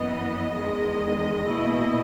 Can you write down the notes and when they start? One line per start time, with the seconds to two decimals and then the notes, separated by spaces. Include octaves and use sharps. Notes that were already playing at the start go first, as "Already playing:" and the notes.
Already playing: F#2 E3 B3 D#5
0.54 E2 D#3 G#3
1.46 B2 A#3 E4